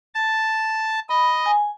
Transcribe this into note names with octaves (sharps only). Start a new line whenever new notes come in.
A5
D#5 B5
G#5